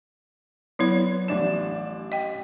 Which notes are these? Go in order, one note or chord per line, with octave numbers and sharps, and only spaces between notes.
F#3 B3 E4 C#5
A1 D4 E7
D#5 G5